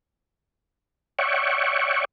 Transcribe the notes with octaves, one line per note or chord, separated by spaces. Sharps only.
C#5 D5 E5 F#5 G5 C#6